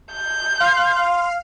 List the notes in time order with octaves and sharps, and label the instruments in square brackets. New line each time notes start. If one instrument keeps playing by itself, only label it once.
[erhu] G6
[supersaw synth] F5 [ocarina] C6